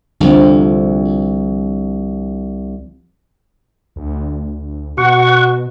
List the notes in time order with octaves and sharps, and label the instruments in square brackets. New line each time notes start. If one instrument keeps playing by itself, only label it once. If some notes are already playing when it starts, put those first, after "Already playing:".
[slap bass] C2 [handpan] D3 F3 C4
[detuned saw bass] D2
[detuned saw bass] B2 [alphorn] F#4 [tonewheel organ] F#5 C#6